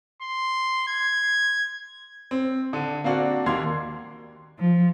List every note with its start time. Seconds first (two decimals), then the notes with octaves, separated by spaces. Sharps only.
0.22 C6
0.88 G#6
2.31 C4
2.73 D3
3.04 A#3 C4 D4 F#4
3.46 D#2 A#3 F5 C6 G#6
4.59 F3